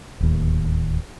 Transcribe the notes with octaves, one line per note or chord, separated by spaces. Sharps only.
D1 D#2